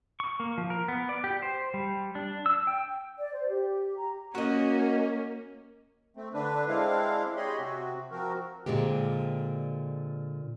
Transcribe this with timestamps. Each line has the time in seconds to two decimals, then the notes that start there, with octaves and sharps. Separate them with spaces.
0.20 C#6
0.40 A#3
0.58 F3
0.70 A#4
0.88 B3
1.09 D5
1.24 G4
1.42 C5
1.74 G3
2.15 D4
2.46 E6
2.67 G5
3.18 D5
3.33 C5
3.48 G4
3.97 A#5
4.35 A#3 C#4 F#4 D#5
6.17 A3 C4
6.34 D3 D4 B4
6.68 G#3 C4 D4 E4 F5
7.36 G4 G#4 C#5 D#5 B5 C6
7.59 C3 C4 F#4
8.11 F3 C4 F#4 A#4
8.66 A#2 D3 G#3 C4 G4